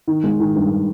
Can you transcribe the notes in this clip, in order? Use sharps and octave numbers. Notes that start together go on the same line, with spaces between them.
D#3
G#3
D#3
G2